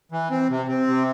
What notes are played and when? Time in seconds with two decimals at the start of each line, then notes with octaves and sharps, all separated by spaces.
0.12 E3
0.31 C4
0.50 C3
0.69 C4
0.87 C3